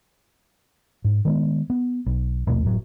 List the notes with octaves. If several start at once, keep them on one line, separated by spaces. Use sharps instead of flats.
G#2
D#3 G#3 B3
B3
B1
A#1 D#2 B2 A3
F#1 A2 F#3